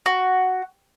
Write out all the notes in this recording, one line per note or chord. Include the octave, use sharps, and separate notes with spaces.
F#4